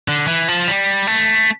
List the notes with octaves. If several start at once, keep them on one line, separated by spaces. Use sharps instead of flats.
D3
E3
F3
G3
A3